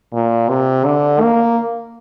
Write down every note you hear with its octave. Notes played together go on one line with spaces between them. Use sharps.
A#2
C3
D3
A#3